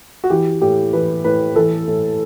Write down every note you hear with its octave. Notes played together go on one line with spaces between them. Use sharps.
F#4
E3 G4
A2 G4
E3 B4
A2 B4
E3 A4
A2